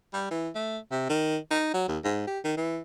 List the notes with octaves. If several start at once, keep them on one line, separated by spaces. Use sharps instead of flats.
G3
E3
A3
C3
D#3
D#4
F#3
D#2
G#2
G4
D#3
E3